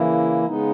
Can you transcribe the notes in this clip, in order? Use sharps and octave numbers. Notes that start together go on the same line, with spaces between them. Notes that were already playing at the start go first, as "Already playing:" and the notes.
Already playing: C#3 E3 A#3 E4
C#3 G#3 B3 D#4